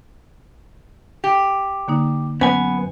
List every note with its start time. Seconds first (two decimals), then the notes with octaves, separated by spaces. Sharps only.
1.24 G4
1.88 D3 A#3 D#4
2.41 F#2 B3 C#4 G#5